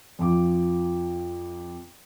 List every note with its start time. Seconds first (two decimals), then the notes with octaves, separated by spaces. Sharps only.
0.19 F2 F3 D6